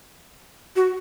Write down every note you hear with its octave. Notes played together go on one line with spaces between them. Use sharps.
F#4